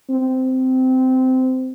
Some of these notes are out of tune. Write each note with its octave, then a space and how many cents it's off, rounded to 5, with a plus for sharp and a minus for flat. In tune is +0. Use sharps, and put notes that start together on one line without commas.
C4 -15